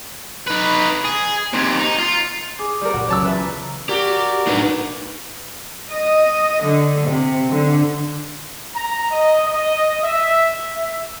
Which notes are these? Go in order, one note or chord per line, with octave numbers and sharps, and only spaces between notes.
D#4 B4
G#4
D#2 C3
D#4
F4
G#4 D6
G3 A#4
A#2 F#4
C#2 F#3 C#5 A5 E6
E2 B4 E5
A#5
F#4 G4 A#4 D5
D4 D#4 B4
D#5
D3
C3
D3
A#5
D#5
D#5
E5
E5